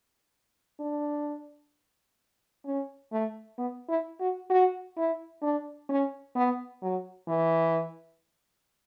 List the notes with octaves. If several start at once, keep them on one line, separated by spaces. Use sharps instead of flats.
D4
C#4
A3
B3
E4
F#4
F#4
E4
D4
C#4
B3
F#3
E3